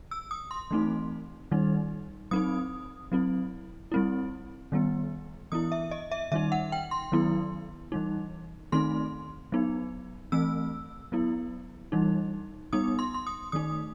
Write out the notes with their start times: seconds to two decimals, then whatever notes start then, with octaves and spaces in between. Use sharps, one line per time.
0.11 E6
0.31 D#6
0.51 C6
0.71 E3 A3 C4 D#4
1.51 D#3 G3 D#4
2.31 F#3 C4 D#4 D#6
3.12 F#3 C4 E4
3.92 G3 C4 E4
4.72 D#3 G3 B3
5.52 E3 B3 E4 D#6
5.72 E5
5.91 D#5
6.11 E5
6.32 D#3 G3 D#4 E5
6.52 F#5
6.72 G5
6.91 C6
7.12 D#3 F#3 B3 E4
7.92 E3 G3 D#4
8.72 D#3 A3 C4 D#4 C6
9.52 F#3 B3 D#4
10.32 E3 A3 C4 E6
11.12 F#3 B3 E4
11.92 E3 G3 D#4
12.73 G3 B3 D#4 D#6
12.99 C6
13.14 C6
13.27 D#6
13.52 D#3 A3 D#4 D#6